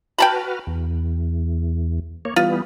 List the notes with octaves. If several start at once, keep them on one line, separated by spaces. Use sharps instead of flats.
F#4 B4 G5 A5 B5 F6
E2
A#3 C#5
E3 G3 B3 F4